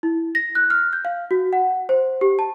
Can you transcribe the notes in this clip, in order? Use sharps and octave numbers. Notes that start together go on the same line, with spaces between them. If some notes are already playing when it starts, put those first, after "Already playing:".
E4
A#6
F#6
F6
G6
F5
F#4
F#5
C5
G4
A5